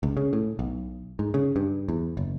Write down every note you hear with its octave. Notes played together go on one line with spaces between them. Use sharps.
C#2
C#3
A2
B1
G#2
C#3
G2
E2
F#1